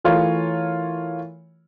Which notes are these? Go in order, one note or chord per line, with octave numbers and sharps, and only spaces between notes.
E3 A3 F4 A#4 C#5